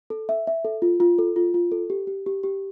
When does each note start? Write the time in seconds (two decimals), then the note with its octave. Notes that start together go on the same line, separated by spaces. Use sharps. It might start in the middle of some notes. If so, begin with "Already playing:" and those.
0.10 A4
0.29 E5
0.47 E5
0.65 A4
0.82 F4
1.00 F4
1.19 A4
1.36 F4
1.54 F4
1.72 A4
1.90 G4
2.07 G4
2.26 G4
2.43 G4